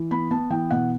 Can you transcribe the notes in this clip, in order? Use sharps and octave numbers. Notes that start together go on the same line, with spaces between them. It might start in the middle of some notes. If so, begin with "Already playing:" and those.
Already playing: E3
B3 B5
B3 A5
E3 G5
B2 F#5